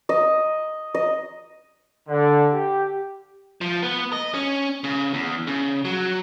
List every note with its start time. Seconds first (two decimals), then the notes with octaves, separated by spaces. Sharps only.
0.09 D#5
0.95 D#5
2.09 D3
2.53 G4
3.61 F3
3.83 B3
4.13 D#5
4.34 C#4
4.84 C#3
5.14 E2
5.47 C#3
5.85 F#3